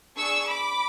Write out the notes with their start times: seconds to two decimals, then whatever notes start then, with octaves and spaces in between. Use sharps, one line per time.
0.16 D4 G#4 C#6 E6
0.47 B5 D6